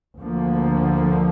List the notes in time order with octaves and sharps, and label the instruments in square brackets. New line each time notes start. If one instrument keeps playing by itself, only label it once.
[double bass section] D2 D3 F3 A#3